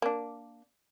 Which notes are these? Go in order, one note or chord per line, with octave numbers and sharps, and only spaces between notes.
A#3 D4